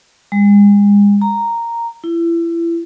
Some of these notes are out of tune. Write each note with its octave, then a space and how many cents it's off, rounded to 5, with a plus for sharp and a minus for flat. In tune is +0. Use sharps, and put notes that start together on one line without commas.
G#3 -35
A#5 -5
E4 +30